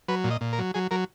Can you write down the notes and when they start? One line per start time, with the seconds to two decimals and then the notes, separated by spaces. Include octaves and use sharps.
0.08 F#3 B4
0.24 A#2
0.31 D#5
0.41 A#2
0.53 A#4
0.59 F#3
0.74 F#3 G#4
0.91 F#3 A#4